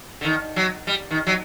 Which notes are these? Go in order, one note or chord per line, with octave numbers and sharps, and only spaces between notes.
D3
D#3
F#3
G3
D#3
F#3